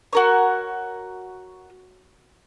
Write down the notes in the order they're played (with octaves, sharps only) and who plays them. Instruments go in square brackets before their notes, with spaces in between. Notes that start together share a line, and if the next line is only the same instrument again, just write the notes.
[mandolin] F#4 A#4 C#5